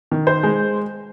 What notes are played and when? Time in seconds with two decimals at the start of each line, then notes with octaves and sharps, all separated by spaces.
0.12 D#3
0.27 C5
0.43 G#3